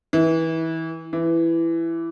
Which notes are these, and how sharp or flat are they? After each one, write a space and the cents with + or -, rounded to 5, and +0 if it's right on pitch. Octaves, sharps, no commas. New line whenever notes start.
E3 -25
E3 +10